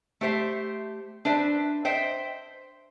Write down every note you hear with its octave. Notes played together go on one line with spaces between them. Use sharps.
A3 G4 C5 E5
D4 B4 C5 E5
C5 D#5 E5 G5